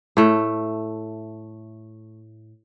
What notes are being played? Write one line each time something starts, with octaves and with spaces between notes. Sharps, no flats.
A2 A3